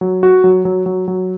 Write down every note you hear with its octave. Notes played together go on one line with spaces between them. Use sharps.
F#3
F#4
F#3
F#3
F#3
F#3